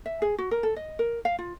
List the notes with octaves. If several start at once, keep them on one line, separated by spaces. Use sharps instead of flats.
E5
G#4
F#4
A#4
A4
D#5
A#4
F5
F4